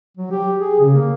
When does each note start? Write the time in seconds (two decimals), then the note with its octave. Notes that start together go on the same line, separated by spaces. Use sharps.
0.17 F#3
0.31 G4
0.59 G#4
0.80 C#3
0.95 A#3